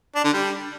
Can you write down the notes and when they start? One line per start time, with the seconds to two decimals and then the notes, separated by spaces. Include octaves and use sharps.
0.15 D4
0.24 D3
0.34 G3